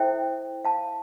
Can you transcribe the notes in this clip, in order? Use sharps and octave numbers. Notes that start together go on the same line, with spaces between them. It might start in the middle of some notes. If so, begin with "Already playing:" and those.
Already playing: E4 A4 C5 E5 G5
F5 A5